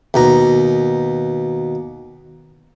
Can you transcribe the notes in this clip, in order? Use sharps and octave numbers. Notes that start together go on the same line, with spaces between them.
D#2 B2 A#5